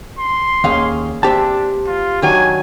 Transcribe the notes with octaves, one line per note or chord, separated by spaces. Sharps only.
C6
D#2 A#3 C#4 G#4 F5
C4 D4 G4 E5 A5
F4
D#3 F#3 D4 G#5